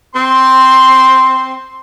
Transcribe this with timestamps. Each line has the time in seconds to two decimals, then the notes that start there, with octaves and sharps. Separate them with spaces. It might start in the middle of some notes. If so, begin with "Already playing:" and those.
0.15 C4 C6